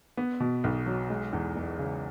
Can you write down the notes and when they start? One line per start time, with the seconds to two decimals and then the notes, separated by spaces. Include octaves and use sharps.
0.17 B3
0.40 B2
0.64 B1
0.86 F#3
1.10 G#3
1.33 E2
1.56 E1
1.79 C#3